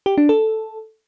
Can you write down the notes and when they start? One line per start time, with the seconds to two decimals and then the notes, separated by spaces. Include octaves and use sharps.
0.06 G4
0.18 D4
0.29 A4